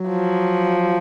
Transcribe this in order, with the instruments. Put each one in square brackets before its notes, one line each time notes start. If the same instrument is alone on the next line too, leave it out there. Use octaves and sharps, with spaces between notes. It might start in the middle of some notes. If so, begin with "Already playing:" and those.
Already playing: [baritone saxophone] F#3
[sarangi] F3